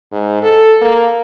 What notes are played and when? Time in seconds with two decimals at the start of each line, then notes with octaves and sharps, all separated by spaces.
0.12 G#2
0.43 A4
0.81 A#3